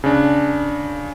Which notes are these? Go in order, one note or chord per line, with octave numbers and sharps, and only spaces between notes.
C#3 D4